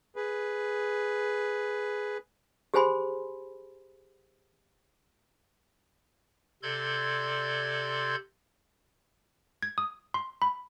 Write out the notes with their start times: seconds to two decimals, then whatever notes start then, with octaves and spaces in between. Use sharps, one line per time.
0.16 G#4 B4
2.74 G4 G#4 C5 G#5 B5 C6
6.63 C3 A4 D5 C6 G6 G#6
9.62 G#6
9.78 D#6
10.14 C6
10.42 B5